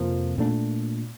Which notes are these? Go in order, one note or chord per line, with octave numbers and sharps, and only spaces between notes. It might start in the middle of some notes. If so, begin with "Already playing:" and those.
Already playing: F2 C3 F3 A#3
A#2 A3 D4